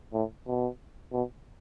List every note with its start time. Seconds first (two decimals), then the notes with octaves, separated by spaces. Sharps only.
0.13 A2
0.47 B2
1.12 B2